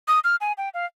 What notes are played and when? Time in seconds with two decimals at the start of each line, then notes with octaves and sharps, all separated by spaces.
0.08 D#6
0.24 F6
0.41 G#5
0.58 G5
0.74 F5